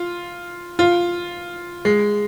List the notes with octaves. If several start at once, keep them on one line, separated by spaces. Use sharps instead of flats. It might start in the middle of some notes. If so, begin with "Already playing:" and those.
Already playing: F4
F4
G#3